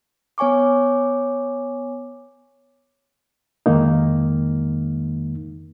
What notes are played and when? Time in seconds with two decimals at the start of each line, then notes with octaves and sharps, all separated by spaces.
0.38 B3 C#5 G#5 C#6 D6
3.66 F2 D#3 G#3 A#3 D#4